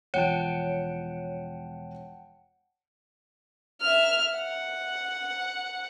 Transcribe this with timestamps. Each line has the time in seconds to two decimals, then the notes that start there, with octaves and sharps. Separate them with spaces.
0.14 E1 F3 C#5 F#5 G5 A5
3.82 E5 F6
4.37 F#5